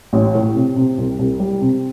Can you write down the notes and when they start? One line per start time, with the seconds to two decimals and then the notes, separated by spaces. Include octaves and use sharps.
0.13 A1
0.35 A2
0.55 C3
0.76 C3
0.98 C2
1.19 C2
1.40 G3
1.61 C3